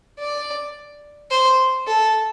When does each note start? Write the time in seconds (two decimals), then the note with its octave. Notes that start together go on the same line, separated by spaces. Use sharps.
0.19 D5
1.31 C5
1.87 A4